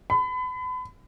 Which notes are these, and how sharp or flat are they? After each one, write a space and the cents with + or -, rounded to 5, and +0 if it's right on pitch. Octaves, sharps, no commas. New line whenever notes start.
B5 +35